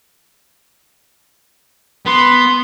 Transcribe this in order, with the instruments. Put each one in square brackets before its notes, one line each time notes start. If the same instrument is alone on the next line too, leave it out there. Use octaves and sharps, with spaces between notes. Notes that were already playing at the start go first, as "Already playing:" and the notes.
[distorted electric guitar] B3 [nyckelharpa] C6